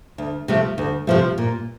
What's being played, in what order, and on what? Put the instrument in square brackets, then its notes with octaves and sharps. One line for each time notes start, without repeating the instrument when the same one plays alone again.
[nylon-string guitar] D2
C3 F3 A3
D2
C3 F3 A3
A#2